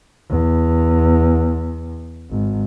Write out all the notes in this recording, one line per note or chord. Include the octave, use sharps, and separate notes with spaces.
E2
G#1